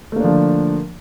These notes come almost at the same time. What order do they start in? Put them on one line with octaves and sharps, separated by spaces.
A3 A#3 D4 F3 D3